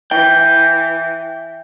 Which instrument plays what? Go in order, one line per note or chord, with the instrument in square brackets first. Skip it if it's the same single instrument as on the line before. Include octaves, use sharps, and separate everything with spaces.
[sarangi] E3 [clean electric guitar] G5